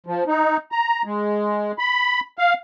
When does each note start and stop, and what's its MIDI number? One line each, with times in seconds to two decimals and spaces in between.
0.06 0.24 53
0.28 0.57 63
0.72 1.02 82
1.05 1.72 56
1.78 2.20 83
2.38 2.54 77